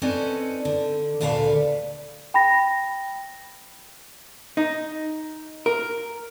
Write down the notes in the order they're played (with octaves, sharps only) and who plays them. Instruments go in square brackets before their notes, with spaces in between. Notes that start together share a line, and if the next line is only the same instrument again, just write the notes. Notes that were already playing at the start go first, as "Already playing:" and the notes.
[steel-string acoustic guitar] C4 C#4 D#4 A4 B4 D5
D3
D2 A#2 D3 B4 D5 F5
[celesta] G5 B5 A#6
[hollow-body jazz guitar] D#4
A#4